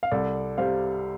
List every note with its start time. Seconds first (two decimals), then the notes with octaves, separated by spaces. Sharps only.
0.03 F5
0.11 C2 A4 D5
0.58 C3 G3 C5 F5